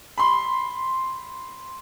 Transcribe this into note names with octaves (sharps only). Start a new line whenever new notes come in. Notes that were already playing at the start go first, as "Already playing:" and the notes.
B5 C6